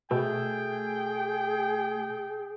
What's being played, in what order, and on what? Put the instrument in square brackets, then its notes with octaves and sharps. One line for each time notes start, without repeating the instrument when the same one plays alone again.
[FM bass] B2 [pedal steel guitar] A3 [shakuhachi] G#4 [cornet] G5